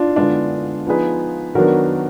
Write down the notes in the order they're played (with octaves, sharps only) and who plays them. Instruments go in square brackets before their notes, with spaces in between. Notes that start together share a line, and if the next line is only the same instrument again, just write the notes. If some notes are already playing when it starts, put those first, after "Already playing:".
Already playing: [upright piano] D4 F4
[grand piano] D3 G#3 B3 [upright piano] D4 F4
[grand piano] F3 B3 D#4 G#4 B4
[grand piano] D#3 F#3 B3 D4 [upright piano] F#4 A#4